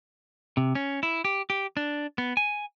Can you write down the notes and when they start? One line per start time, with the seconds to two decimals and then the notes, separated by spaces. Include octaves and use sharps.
0.57 C3
0.75 C#4
1.03 E4
1.25 G4
1.50 G4
1.77 D4
2.18 B3
2.37 G#5